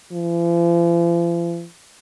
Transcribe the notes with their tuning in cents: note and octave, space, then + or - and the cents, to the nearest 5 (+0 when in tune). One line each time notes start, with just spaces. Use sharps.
F3 -45